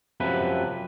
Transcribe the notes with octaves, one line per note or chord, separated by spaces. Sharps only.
F#2 C3 F3 B4